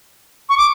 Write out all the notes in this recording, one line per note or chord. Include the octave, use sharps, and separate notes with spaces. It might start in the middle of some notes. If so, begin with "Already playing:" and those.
C#6
D6